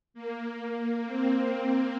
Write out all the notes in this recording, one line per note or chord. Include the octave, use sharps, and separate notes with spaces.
A#3
C4